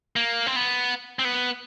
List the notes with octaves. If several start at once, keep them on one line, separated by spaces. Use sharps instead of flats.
A#3
C4
B3
C4
B3